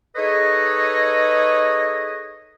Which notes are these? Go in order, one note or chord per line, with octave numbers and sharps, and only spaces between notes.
D#4 G#4 A4 B4 C#5 D#5